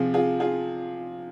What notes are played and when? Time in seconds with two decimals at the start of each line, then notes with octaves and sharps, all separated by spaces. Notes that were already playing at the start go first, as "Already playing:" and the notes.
Already playing: C3 F3 C4 F4 G#4
0.14 F4 G#4
0.40 F4 G#4